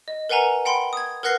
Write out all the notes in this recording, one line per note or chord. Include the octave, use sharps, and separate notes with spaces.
D#5
A#4 B4 F#5 G#5 A#5
F#5 G5 B5 C6
D#6 G#6
A#4 B4 F#5 F#6 A#6 C7